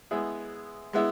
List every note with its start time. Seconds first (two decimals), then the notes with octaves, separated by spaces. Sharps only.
0.11 G#3 B3 E4 G#4
0.93 G#3 B3 E4